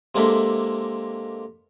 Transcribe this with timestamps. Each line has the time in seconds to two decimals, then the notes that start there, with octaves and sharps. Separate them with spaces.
0.15 C3 G#3 A#3 D4 A4 E5